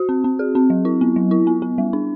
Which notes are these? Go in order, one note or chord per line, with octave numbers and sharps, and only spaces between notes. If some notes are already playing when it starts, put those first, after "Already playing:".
Already playing: F#4
C4
C4
G#4
C4
F#3
E4
B3
F#3
E4
B3
B3
G3
D4